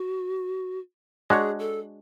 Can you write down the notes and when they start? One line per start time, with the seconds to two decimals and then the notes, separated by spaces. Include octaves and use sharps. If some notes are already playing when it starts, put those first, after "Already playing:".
Already playing: F#4
1.30 G#3 D4 F#4 G#4 C#5
1.59 A4